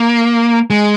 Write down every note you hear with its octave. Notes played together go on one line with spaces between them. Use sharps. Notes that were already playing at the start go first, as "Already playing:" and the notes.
Already playing: A#3
G#3